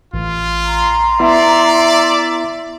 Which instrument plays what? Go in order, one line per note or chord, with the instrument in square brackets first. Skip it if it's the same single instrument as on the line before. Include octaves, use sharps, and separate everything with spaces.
[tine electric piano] A1 [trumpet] F4
[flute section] A#5 C6
[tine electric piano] B3 E4 [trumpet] D5 [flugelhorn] E5